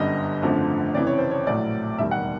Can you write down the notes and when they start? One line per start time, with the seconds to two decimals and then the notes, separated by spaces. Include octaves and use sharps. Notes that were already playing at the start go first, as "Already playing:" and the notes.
Already playing: G1 F#2 D3 G3 D#5
0.42 G#1 F#2 D3 F3 A3
0.95 F1 F2 C#3 E3 D5
1.07 C#5
1.18 C5
1.31 C#5
1.46 A#1 A2 F#3 A3 D5
1.98 E1 D#2 D#3 G3 E5
2.11 F#5